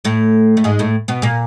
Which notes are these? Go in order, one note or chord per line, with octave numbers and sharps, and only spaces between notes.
A2 A3
A3
G#2 G#3
A2 A3
B2 B3
A#2 A#3